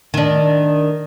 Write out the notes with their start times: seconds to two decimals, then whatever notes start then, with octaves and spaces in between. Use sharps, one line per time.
0.14 D#3 D4